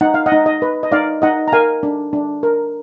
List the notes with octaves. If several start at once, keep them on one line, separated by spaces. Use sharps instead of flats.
D#4 F#5
F5
D#5 F#5
D#4
D#5
B4
D#5
D#4 D5 F5
D#4 D#5 F#5
A#5
A#4 F5 G#5
D4
D4
A#4